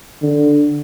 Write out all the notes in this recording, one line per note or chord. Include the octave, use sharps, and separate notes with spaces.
D3